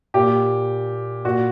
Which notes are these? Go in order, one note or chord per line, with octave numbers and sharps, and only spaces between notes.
A#2 G4
A#2 F#4